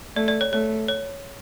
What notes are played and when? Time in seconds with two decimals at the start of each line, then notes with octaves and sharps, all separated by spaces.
0.16 A3 D5
0.28 D5
0.41 C#5
0.52 A3 C#5
0.88 C#5